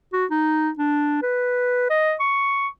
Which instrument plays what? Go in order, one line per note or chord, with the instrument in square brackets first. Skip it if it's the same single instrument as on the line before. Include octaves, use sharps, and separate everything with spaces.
[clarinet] F#4
D#4
D4
B4
D#5
C#6